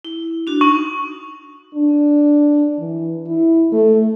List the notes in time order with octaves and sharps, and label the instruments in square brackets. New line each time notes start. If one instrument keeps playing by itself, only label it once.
[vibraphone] E4
D4 F#4
[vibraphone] D#4 [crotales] C#6
[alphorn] D4
E3
E4
A3